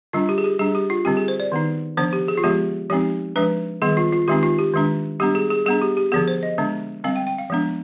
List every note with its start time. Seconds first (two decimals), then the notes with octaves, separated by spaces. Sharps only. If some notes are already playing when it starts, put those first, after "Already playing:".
0.13 D3 G3 D4 F4
0.29 G4
0.38 G#4
0.44 G4
0.59 G3 D4 G#4
0.75 G4
0.90 F4
1.05 D3 G3 C4 G4
1.17 G#4
1.28 C5
1.40 D5
1.52 D#3 B3 D#4
1.97 D3 F3 B3 D4 C5
2.13 G4
2.28 G#4
2.38 F4
2.44 D3 F3 G#3 B3 G4
2.90 F3 G#3 C4 D#4 G4
3.36 F3 G#3 D4 B4
3.82 D#3 G3 B3 G#4
3.97 F4
4.12 F4
4.28 D#3 G#3 C4 D#4 G4
4.43 F4
4.59 G4
4.74 D#3 G#3 D4
5.20 G3 B3 D4 G4
5.35 G#4
5.50 G#4
5.66 G3 B3 D4 G#4
5.82 G4
5.97 G4
6.12 D3 F3 B3 G#4
6.28 C5
6.43 D#5
6.58 D3 G#3 B3 D4
7.04 D3 G3 C4 F5
7.16 G5
7.27 G5
7.38 F5
7.50 F3 G#3 B3 D4